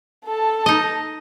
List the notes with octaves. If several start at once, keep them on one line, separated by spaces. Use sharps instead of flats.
A4 A5
D#4 D#5